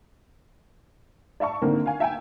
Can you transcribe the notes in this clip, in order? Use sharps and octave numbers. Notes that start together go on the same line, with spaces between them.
D5 E5 A5 C#6
D3 D#3 A#3 C4 A#4
F5 G#5
E5 G5 G#5